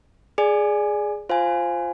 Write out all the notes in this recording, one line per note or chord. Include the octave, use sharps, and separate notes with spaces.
G#4 D5 G#5
F4 C5 F5 G#5